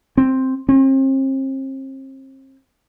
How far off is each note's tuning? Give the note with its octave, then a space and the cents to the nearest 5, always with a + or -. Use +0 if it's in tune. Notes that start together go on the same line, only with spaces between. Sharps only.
C4 +5
C4 +40